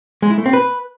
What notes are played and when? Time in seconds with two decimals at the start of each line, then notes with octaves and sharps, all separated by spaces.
0.22 G#3
0.30 E4
0.38 A3
0.46 C4
0.53 B4